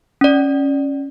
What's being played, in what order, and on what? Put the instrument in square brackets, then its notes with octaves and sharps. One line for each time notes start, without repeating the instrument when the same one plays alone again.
[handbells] C#4 D5